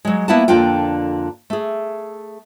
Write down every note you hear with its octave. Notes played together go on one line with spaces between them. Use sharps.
F#3 G#3
A#3 B3 E4 E5 F#5 A5
F2 D3 A#3 D4 F4 G5
A3 G#4